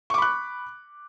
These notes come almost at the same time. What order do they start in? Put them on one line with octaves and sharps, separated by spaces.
C#6 D6 B5 F#6